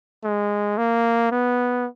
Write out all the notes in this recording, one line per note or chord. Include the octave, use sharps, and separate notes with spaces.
G#3
A#3
B3